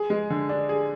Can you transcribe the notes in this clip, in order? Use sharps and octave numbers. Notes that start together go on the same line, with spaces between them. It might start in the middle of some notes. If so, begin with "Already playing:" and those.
Already playing: G#4
G#3
D3
D4
G#4